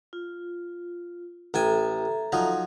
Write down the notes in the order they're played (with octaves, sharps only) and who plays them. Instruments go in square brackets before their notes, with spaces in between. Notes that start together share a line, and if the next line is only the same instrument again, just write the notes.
[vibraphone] F4
[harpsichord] A1 G5 G#5 [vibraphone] A4 E5 A#5
[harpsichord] F3 F#3 D#4